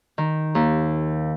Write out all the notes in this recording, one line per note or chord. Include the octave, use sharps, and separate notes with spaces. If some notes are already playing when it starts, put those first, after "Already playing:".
D#3
D#2